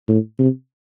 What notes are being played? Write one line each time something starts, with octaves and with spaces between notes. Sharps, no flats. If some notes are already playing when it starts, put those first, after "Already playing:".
A2
C3